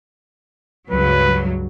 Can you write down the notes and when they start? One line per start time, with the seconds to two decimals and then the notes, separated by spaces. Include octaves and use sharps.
0.91 C#2 G2 F#3 B4